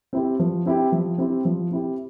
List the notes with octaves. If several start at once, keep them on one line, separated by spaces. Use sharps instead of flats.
C4 E4 G4
F3
C4 E4 G4
F3
C4 E4 G4
F3
C4 E4 G4